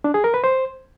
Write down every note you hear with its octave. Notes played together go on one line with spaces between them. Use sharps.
D4
G#4
A#4
B4
C5